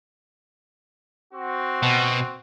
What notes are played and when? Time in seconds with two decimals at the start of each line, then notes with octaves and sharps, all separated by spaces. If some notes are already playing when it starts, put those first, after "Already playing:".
1.32 C4 F#4
1.83 B2